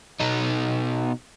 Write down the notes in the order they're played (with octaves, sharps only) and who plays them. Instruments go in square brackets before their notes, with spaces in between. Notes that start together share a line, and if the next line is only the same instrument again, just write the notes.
[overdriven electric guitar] B2 D#4